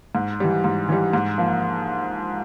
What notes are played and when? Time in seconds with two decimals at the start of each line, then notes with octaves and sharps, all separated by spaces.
0.15 G#2
0.40 E3 G3
0.64 G#2
0.89 E3 G3
1.13 G#2
1.38 F3 A#3